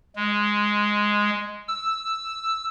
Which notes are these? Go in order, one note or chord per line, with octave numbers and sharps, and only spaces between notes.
G#3
E6